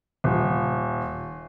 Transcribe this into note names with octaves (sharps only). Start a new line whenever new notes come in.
D#1